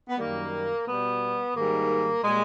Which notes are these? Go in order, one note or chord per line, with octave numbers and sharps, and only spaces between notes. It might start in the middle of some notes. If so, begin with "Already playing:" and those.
B3
F#2 D#3 G3 A#3
B2 G3 B3
G#2 D#3 G3 A#3
A#2 G3 G#3